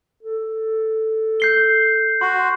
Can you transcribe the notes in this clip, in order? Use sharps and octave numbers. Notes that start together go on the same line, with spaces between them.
A4
G6 C7 G7
F#4 C6